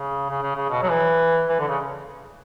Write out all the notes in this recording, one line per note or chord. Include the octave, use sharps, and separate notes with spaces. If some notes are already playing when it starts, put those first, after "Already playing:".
Already playing: C#3
C#3
C#3
C#3
B2
F#3
E3
E3
D3
C#3